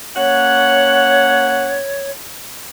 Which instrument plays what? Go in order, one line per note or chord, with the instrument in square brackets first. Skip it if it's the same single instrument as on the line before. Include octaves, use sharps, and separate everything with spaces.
[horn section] A#3 C#4 F#5 [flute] C#5